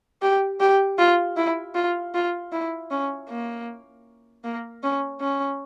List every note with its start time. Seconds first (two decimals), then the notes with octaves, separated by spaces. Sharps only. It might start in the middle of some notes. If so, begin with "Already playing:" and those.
0.22 G4
0.60 G4
0.99 F4
1.37 E4
1.75 F4
2.14 F4
2.52 E4
2.91 C#4
3.29 A#3
4.44 A#3
4.83 C#4
5.21 C#4